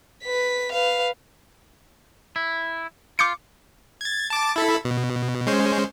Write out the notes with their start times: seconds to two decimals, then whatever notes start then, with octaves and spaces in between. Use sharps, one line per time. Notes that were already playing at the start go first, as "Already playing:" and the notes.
0.24 B4 B6
0.73 B4 F5
2.36 E4
3.19 F4 D6 G6 C#7
4.01 G#6 A6
4.30 A5 D6 A6
4.56 E4 A4 B5
4.85 B2
5.47 G#3 C#4 C5